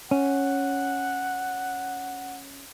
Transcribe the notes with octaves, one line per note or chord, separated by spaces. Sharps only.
C#4 F#5